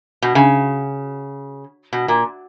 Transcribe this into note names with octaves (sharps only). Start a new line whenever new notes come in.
B2
C#3
B2
A#2